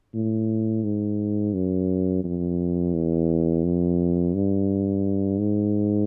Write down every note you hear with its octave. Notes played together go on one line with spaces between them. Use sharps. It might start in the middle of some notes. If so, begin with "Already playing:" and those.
A2
G#2
F#2
F2
E2
F2
G2
G#2